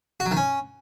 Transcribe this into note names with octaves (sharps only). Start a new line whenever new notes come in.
F#4
F#3
D#3
C#4